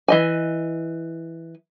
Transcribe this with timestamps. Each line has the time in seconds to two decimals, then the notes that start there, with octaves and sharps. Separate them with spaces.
0.08 E3 D#5 G#5